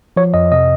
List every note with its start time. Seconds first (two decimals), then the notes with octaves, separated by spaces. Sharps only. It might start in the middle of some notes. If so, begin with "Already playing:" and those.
0.16 F3 C#5
0.34 F2 D#5
0.52 C3 D#5